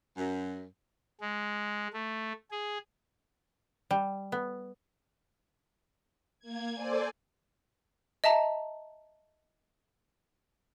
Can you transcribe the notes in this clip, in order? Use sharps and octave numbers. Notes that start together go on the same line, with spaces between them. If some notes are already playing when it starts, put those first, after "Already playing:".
F#2
G#3
A3
G#4
G3
B3
A#3 G#6
A4 C5 D5 G#5
D#5 E5 A5 A#5